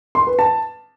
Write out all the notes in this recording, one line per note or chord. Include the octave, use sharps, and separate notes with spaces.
C6
B4
A5